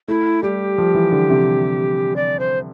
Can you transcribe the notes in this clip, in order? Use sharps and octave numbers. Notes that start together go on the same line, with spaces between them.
A3 E4
G3 G4
F3
E3
D3
C3
D5
C5